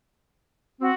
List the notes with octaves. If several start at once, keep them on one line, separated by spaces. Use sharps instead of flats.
C4 F#4